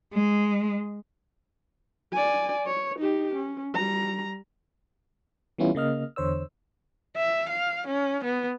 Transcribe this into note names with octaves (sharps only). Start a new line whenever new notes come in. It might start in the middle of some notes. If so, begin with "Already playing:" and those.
G#3
D5 G#5
C#5
D#4 G4
C#4
G3 A#5
E3 G3 B3 C#4 E4 F4
C#3 A#3 D#5 F6
E2 D3 C5 C#5 E6
E5
F5
C#4
B3